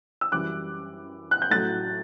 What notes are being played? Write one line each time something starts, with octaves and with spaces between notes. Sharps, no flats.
E6
F#2 E3 G3 D6 F#6
F#6
G6
A2 F#3 F#6 A6